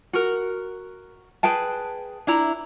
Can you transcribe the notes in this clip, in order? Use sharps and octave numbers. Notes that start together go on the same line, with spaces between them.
F#4 A#4
G#4 B4 G5 A5
D4 E4 A#5